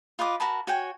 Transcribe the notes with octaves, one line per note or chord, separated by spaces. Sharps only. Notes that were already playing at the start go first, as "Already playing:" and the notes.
F4 B4 D#5 D6
F#4 A#4 A5 B5
F#4 C#5 G5 G#5